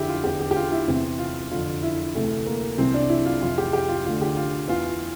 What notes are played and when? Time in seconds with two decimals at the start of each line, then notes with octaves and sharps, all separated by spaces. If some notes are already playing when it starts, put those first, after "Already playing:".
Already playing: F2 D3 E4 G4
0.09 F4
0.24 E2 D3 G4
0.40 G4
0.51 G4
0.56 F4
0.72 E4
0.87 E2 C3 E3 C4
1.19 F4
1.52 F2 D3 F4
1.83 E4
2.15 D2 C3 E3 A3
2.47 A#3
2.78 C2 C3 E3 C4
2.94 D4
3.09 E4
3.26 F4
3.41 F2 C3 E3 F4
3.58 G4
3.73 G4
3.89 F4
4.05 D2 D3 F4
4.21 G4
4.37 F4
4.68 E2 E3 F4